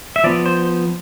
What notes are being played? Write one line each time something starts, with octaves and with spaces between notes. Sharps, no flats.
E5
F3 B3 D5
C5